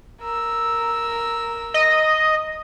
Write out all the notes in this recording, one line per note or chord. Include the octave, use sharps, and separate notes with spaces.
A#4 E6
D#5